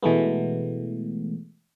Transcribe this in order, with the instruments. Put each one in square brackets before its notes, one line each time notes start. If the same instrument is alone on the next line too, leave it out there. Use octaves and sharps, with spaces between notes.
[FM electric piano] B2 E3 G#3 A3 B3